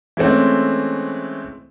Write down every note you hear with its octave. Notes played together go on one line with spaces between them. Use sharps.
E3 G#3 A3 C4 C#4